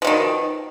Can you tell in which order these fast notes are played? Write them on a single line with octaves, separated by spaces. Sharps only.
F3 B2 D#3